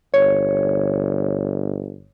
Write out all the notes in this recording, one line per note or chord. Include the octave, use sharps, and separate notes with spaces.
G1 C#5